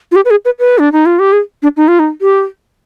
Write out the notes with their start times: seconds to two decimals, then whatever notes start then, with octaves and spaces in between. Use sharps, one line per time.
0.12 F4
0.16 G4
0.25 B4
0.30 G#4
0.45 B4
0.59 B4
0.78 D4
0.92 D#4
1.06 F4
1.19 G4
1.32 G#4
1.62 D4
1.77 D#4
1.88 F4
1.99 D#4
2.21 G4